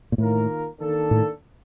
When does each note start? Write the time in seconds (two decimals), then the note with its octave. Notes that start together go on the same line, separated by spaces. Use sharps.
0.12 A#2
0.18 A2 D#3 A#3 F4 A#4
0.80 D#3 A#3 D4 A4
1.11 A2